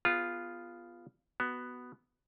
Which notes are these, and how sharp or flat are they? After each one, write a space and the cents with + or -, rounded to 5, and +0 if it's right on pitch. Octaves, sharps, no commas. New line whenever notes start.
B3 +0 F4 +0 G#4 -25
B3 +0 F#4 +10